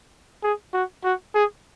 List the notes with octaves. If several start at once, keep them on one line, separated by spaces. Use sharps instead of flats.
G#4
F#4
F#4
G#4